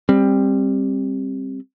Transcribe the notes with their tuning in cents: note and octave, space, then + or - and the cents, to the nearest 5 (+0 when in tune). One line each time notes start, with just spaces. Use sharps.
G3 +15 C4 +15